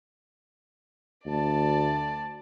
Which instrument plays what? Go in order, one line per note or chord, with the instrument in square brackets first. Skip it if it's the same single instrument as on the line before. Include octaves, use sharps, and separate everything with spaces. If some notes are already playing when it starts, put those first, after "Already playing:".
[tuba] D2 [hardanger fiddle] D5 A5